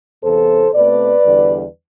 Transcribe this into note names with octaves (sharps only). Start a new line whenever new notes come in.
E2 C3 E3 B3 A4 C5
B2 A3 C4 B4 D5
E2 D3 G3